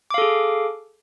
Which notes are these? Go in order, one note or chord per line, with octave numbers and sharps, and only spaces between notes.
G#4 A4 F5 D6